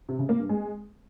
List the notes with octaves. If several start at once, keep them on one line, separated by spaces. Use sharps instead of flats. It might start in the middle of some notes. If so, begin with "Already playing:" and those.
C3
C#3
A#3
G2
G#3